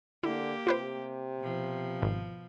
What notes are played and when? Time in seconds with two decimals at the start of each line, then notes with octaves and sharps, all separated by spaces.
0.23 D3 A#3 E4 G4
0.67 C3 F4 B4 C5
1.39 B2 F3
2.02 G#1